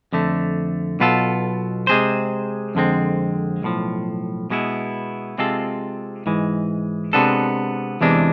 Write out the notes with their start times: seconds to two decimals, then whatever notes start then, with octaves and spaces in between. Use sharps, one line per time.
0.13 F2 D3 A3
1.00 B1 B2 B3 F4 A4
1.87 C3 G#3 C4 G#4 C5
2.75 F2 D3 G#3 C4
3.63 B1 A2 F3
4.50 B2 G#3 B3 E4
5.38 C3 G#3 C4 F4 A4
6.26 G#2 E3 G#3
7.13 C3 G#3 B3 D4 A4
8.01 E2 C3 E3 G#3 D4